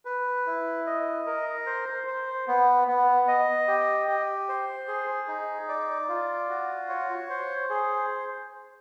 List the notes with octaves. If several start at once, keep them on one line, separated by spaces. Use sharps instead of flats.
B4
E4
D#5
A#4
C5
C5
B3
B3
D#5
G4
G4
C5
G#4
D#4
D5
F4
F#4
C#5
C5
G#4